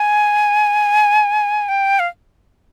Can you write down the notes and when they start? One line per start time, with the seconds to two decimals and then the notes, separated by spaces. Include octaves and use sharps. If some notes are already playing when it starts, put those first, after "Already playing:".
Already playing: G#5
1.68 G5
1.99 F5